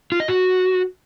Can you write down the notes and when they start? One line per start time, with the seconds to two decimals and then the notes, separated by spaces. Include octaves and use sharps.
0.12 F4
0.20 D#5
0.28 F#4